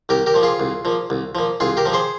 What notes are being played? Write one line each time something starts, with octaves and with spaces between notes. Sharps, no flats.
C2 G4 A#4
G4 A#4
A#2 F3
F4 G#4
C2
A#2 F3
C2
A#2 F3
C2 F4 G#4
G4 A#4
A#2 F3
G#4 C5